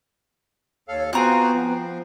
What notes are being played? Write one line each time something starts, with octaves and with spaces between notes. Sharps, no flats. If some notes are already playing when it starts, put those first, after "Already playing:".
D#2 A4 C#5 F5
B3 C4 F4 F#4 G#4 C5 A#5 F#6
F3